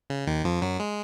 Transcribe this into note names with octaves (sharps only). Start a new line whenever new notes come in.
C#3
D#2 D#3
F2 F3
F#2 F#3
G#3